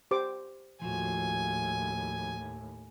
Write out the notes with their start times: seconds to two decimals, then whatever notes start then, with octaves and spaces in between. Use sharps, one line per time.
0.11 G4 C5 D6
0.81 D#2 A2 F3 F4 F#4 G#5